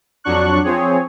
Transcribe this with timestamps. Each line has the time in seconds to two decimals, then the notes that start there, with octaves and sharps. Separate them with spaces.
0.24 F2 F#3 D4 C#6 F#6
0.64 F3 C4 G#4 C#5